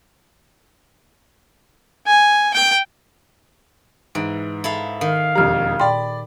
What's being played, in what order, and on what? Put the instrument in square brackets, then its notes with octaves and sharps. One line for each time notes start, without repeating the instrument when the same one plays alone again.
[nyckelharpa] G#5
G5
[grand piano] G#2 D7 [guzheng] E3
[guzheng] E4 A4 F5
[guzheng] D#3 [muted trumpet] F5
[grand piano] E1 F2 A#5 [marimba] G4 F6
[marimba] A#2 G5 C6 [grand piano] D5 B5